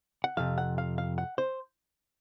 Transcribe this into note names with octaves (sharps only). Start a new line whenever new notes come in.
F#5
F2 C3 F5
F#5
F5
F5
F#5
C5